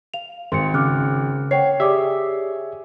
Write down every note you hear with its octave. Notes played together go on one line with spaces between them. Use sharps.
F5 F7
G#1 C6 C#7
C#3 D6 F6 F#6
C#5 F#5 G5 C7
G4 G#4 D5 E5 D6